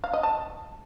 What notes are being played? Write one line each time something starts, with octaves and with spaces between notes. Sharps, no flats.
F5
D#5
A5